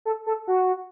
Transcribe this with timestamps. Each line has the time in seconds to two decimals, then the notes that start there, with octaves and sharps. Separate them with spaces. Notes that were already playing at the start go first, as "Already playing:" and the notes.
0.05 A4
0.26 A4
0.47 F#4